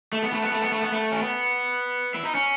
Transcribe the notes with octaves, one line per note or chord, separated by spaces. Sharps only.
A3
B3
A3
B3
A3
B3
A3
B3
A3
C#4
B3
E4
D#4
C#4